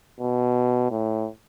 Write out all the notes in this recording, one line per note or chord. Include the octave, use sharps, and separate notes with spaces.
B2
A2